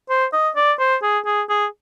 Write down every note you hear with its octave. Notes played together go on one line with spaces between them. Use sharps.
C5
D#5
D5
C5
G#4
G#4
G#4